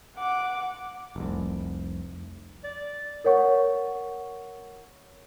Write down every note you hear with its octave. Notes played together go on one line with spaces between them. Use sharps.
F#5 D6
F1 C2
D5
A#4 C#5 F#5 C#6